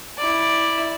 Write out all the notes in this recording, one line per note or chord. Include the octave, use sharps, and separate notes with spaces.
E4 D5